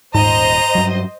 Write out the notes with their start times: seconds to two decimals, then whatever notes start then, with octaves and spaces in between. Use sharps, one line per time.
0.15 D#1 G#2 C5 D#5 A#5
0.75 G2 F#3